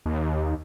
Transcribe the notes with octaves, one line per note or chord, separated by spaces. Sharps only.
D#2